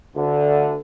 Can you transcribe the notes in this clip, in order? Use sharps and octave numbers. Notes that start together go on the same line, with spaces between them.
D2 D3